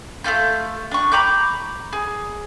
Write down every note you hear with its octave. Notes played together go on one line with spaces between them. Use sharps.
A3 A#3 F4 G6
D4 C#6
A#5 B5 D6 G6
G#4